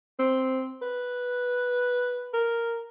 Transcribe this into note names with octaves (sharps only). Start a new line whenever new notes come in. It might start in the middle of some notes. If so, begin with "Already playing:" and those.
C4
B4
A#4